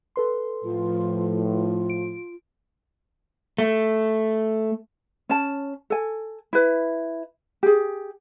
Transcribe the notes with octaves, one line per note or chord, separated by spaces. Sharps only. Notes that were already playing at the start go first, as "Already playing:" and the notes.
A4 B4 C6
A2 F3 F4
F4
D7
A3
C#4 A5
A4 G#5
E4 B4
G4 G#4